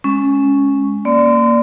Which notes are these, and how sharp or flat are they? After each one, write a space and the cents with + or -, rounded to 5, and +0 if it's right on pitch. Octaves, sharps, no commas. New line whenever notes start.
G#3 +0 C#4 +0
A#3 +0 D5 +0 C6 -35